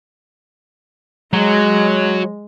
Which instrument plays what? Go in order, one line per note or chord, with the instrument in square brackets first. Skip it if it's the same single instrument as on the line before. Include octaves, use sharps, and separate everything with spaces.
[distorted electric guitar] F#3 [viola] G#3